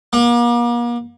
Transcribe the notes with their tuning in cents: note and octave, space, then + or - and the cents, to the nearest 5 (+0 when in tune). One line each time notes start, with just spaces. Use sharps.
A#3 +40